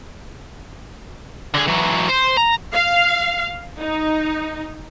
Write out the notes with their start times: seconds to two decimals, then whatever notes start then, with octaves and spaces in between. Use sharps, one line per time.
1.54 D3 G#4
1.67 E3 F#3
2.09 C5
2.37 A#5
2.74 F5
3.80 D#4